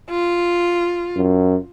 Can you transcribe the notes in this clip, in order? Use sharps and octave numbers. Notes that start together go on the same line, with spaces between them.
F4
F#2